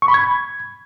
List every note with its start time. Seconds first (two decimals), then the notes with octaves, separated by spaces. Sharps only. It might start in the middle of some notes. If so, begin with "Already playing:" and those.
0.02 C#6
0.08 B5
0.14 G#6